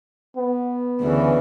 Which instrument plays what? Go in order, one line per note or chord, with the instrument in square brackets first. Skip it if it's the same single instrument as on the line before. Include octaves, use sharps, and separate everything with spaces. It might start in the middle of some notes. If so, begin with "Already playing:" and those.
[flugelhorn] B3
[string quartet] D2 C#3 E3